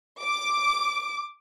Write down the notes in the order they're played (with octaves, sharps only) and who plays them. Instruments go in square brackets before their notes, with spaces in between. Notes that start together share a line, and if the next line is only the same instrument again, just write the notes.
[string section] D6